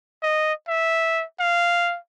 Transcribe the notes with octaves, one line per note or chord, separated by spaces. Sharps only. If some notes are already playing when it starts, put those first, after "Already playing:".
D#5
E5
F5